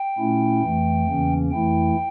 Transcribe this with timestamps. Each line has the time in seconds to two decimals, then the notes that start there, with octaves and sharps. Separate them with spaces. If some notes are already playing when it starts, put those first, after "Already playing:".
Already playing: G5
0.18 A#2 A3 C#4 E4
0.62 F2 E3 A3
1.07 E2 C#3 E3 A#3 C#4
1.51 F2 E3 A3 E4 G5